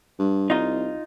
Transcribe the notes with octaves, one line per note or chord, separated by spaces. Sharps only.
G2
C2 D#4 F4